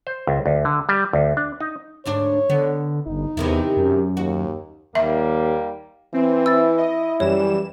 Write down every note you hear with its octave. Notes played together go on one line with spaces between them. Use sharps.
C5
C#2
D2
D3
G3
D2
D4
D#4
D2 G#2 D4 C#5
D3 B3
G1 D#4
E2 C3 D#3 E4
F#2
D#2 F#4
D#2 G3 A#3 E5
E3 C4
E4 E6 A6
D#5
F#2 E3 G3 C#5 E7